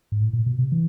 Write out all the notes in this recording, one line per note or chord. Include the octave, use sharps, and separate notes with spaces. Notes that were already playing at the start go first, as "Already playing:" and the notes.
G#2
A2
A#2
B2
C3
E3